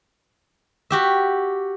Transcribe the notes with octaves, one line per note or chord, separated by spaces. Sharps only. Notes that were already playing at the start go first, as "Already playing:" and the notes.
F#4 G4 E5